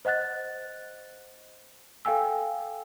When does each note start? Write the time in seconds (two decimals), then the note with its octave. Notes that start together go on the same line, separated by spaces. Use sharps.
0.05 C5 D#5 F#5 F#6 A6
2.05 A4 F5 G5 G#5 E6